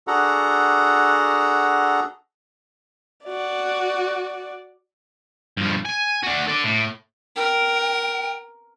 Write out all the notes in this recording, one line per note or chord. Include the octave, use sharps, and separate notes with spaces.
D4 F#4 G#4 A4 F#5 A#5
F#4 D5
G2 F3
G#5
D4 F#4
A4 D5
A2
A#4 G5